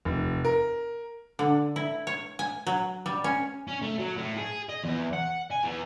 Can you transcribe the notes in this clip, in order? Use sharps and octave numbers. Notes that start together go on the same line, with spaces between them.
F1
A#4
D3
E4
C#5
G#5
F#3
G3
C#4
C#4
A3
F#3
A2
G#4
D#5
E2
F#5
G#5
E2